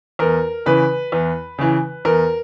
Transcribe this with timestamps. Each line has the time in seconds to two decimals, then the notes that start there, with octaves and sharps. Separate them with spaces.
0.19 E2 A#4
0.66 C#3 E3 B4
1.12 E2
1.58 C#3 E3
2.05 E2 A#4